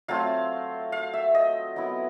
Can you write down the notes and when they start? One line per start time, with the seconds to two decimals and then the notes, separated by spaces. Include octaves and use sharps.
0.08 F#3 A3 C4 F4 F5
0.92 F5
1.13 E5
1.35 D#5
1.76 F#3 B3 E4